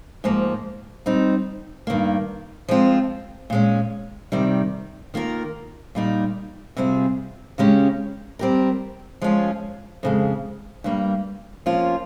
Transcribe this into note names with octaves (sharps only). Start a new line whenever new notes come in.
G#2 F3 A#3
G3 C4 D#4
G2 D#3 A#3
F3 G#3 C4 F4
A#2 G#3 C#4
C3 D#3 G3
D#3 A#3 F4 A#4
A#2 G3 A#3 D#4
C3 G3 C4 F4 G#4
C#3 G#3 C#4 G4
G3 C4 G4 A#4
F3 G#3 C#4 F4
F2 C#3 G#3
G2 G3 A#3
F3 A#3 C#4 F4